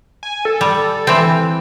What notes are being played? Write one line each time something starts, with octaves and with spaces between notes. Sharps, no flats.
G#5
A4
G3
E3 C4